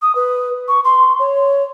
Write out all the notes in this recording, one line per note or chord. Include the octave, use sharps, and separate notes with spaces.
D#6
B4
C#6
C6
C#5